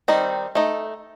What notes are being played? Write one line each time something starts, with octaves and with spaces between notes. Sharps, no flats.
D#3 G3 C4 D#4
A3 D#4